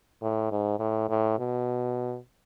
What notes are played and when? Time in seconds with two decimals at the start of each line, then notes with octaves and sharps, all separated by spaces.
0.22 A2
0.51 G#2
0.80 A2
1.09 A2
1.38 B2